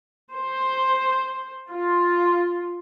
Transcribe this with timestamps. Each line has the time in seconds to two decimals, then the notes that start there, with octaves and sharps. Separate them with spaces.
0.32 C5
1.69 F4